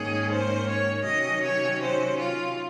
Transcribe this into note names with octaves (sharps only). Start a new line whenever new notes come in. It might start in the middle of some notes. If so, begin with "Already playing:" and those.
Already playing: G#2 D#3 A#3 C#4 G#4
C5
C#5
C3 D#3 F#3 C#4 D#5
C#5
C5
F4